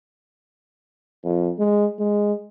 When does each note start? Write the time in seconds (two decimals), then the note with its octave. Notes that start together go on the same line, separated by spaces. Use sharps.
1.24 F2
1.59 G#3
1.99 G#3